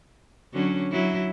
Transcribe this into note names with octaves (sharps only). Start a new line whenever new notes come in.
D3 F#3 C#4
F#3 E4